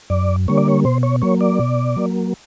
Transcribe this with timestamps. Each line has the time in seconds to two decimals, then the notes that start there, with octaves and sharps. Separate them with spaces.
0.10 F#2 D5
0.48 D3 G3 A#3 C#5
0.57 D5
0.68 C#5
0.85 B2 C5
1.03 C#5
1.22 F#3 A#3 C#5
1.41 D5
1.59 B2
1.97 F#3 A#3